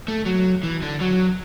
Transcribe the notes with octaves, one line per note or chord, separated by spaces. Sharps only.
A3
F#3
E3
D3
F#3